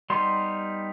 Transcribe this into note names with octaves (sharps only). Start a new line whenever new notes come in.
G3 B3 D#4 C6